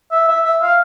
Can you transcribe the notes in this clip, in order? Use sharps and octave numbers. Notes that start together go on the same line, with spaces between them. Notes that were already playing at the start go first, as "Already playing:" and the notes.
E5
E5
E5
F5